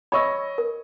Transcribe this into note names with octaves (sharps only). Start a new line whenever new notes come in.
C#5 D#5 B5 C#6 E6
A#4